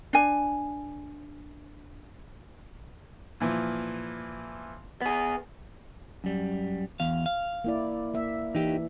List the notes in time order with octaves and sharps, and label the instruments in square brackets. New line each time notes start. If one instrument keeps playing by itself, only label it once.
[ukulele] D4 G#5
[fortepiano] A#2 E3 F3
[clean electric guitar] B3 G#4
F#2 G3
E2 F5
F5
[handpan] A#3 E4 D5
A#3 E5
[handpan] E3 [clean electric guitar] D#4 G4